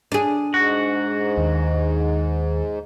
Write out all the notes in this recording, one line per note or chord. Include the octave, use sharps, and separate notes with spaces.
D4 G#4
G#2 F#4
D#2